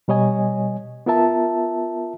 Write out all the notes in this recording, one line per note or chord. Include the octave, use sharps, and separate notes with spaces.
B2 G3 C#5 D#5 G#5
B3 F4 A#4 E5 A5